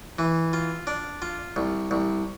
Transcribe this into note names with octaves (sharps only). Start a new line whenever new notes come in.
E3
F4
D4
F4
C2
C2